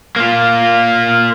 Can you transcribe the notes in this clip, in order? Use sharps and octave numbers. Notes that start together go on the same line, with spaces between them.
A#3 F4